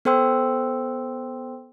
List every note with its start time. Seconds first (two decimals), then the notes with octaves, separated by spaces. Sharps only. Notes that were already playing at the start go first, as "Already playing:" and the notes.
0.05 B3 A4 C5 G5 C6 E6